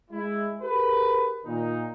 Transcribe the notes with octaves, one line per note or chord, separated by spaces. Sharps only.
G#3 E4
G4 G#4 A#4 B4
A#2 D#3 D#4